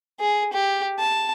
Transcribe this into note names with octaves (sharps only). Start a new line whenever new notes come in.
G#4
G4
A5